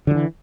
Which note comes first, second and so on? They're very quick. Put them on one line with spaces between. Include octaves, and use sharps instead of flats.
D3 F3 E3